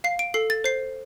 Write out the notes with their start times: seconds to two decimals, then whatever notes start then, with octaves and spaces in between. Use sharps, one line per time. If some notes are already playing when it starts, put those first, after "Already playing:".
0.04 F5 C7
0.19 D7
0.34 A4 C7
0.50 A6
0.64 C5 C7